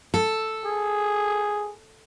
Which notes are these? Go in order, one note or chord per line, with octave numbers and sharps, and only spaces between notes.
A4
G#4